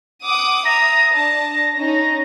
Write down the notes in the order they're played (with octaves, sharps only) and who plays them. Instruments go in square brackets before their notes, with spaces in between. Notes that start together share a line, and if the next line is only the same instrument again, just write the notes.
[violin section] F#5 D6 D#6
[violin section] E5 A#5 D#6 [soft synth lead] A#6
[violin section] D4 A5
C#4 D#4